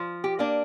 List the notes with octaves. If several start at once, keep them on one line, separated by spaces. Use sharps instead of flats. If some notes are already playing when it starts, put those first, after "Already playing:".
Already playing: F3
G4
A#3 D4